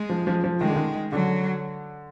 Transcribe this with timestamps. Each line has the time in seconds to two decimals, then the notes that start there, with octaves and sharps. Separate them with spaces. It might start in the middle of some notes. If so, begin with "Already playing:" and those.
Already playing: G#3
0.10 F3
0.27 F3
0.44 F3
0.61 D#3 G#3
0.68 D3
0.76 D#3
1.12 D3 F#3